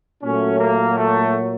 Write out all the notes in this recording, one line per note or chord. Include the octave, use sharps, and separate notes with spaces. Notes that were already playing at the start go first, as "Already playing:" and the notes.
A#2 F#3 A3 C#4
A#3
A3